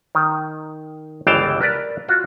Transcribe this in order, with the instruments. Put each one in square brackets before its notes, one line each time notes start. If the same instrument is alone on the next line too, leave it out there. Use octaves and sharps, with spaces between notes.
[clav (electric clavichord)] D#3
G1 C#2 E3 F5 G5 A5
A#4 B4 D5
F4 F#4